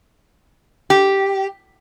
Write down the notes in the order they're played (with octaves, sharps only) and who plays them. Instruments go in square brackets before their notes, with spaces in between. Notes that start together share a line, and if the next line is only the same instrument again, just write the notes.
[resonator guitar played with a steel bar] G4